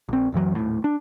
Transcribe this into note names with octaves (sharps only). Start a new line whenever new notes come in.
A#1 C4
D1 F#2 E3 F#3
D#1 A2
D4